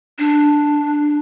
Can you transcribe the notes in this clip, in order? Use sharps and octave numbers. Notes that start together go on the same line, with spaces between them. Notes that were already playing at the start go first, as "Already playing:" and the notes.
D4